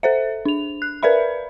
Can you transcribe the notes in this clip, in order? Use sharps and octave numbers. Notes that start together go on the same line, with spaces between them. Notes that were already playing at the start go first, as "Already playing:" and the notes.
A4 C5 E5
D4 F7
F#6
A#4 B4 D5 E5 B5